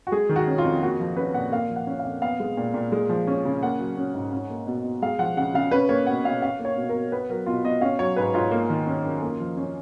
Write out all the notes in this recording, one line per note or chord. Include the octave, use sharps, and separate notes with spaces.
F#4
G#3 G#4
D#3
F#4
C#4
F4
F2
A#3 F#4
F3
C#4 B4
A#2 F#5
A#3 F5
F3
F#5
C#4
F5
F2
B3 F5
G#3
A#2
A#2
G#3
F3
C#4
C#3
A#3 F#5
F#3
C#4
G#2
C#4
A#3
B2
B2
G#3 F5
F3 F#5
C#3 F#5
C#3 F5
C#4 B4
A#3 C#5
B2 F#5
B2 F5
C#4 F5
A#3
C#5
B2
A#4
B2
B3 B4
F#3 A#4
B2 F4
B2 D#5
C#4 F5
F#3 C#5
G#2 B4
G#2 F4
A#3
D#3
C#4
F#2
A#3
F3
C#4